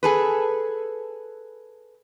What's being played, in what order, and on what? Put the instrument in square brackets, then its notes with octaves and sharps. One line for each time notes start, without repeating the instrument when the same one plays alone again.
[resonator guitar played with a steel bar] G#4 A4 B4